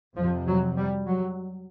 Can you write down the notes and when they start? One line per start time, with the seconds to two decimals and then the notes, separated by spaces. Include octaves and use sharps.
0.16 F2 C3 F3
0.46 F#3
0.77 G3
1.07 F#3